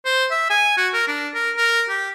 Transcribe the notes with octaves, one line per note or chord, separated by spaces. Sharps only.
C5
E5
G#5
F#4
A#4
D4
A#4
A#4
G4